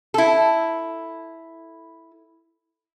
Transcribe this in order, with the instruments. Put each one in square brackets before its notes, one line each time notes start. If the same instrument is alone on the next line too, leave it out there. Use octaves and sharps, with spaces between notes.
[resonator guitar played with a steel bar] E4 A4